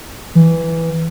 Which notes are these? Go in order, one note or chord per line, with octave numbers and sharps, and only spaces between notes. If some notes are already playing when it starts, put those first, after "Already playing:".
E3